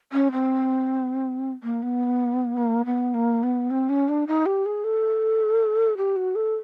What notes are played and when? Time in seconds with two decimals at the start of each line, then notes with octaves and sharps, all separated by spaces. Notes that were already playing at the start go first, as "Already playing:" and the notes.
0.13 C#4
0.32 C4
1.63 A#3
1.83 B3
2.57 A#3
2.86 B3
3.14 A#3
3.43 B3
3.71 C4
3.89 C#4
4.08 D4
4.28 D#4
4.46 G4
4.66 G#4
4.84 A4
5.97 G4
6.16 F#4
6.35 A4